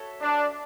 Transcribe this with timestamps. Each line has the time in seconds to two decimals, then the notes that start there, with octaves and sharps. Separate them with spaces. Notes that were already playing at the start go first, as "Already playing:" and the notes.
Already playing: F#4 A4 C#5 E5
0.21 D4